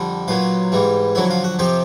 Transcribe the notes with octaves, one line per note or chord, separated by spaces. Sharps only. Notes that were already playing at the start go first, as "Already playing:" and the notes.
Already playing: F2 D3 G3
B1 A#2 F#3 F4
G#2 E3 G3
F2 D3 F#3 E4
F4
F#4
F2 C3 F3 G4